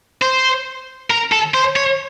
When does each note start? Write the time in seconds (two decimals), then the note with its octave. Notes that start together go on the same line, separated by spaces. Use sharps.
0.22 C5
1.10 A#4
1.32 A4
1.54 C5
1.76 C#5